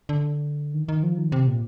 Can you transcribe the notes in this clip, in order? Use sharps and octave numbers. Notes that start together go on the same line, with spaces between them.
D3
D#3
D#3
F3
D#3
C3
A#2